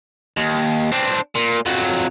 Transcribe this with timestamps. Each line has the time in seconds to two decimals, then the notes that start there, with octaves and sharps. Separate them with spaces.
0.37 D#2
0.92 C4 D4
1.35 A#2
1.66 F2 F#3